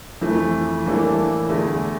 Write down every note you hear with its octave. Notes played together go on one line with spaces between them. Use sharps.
F2 E3 A3
A2 E3 A#3 D4 A4
E2 D3 A3 E4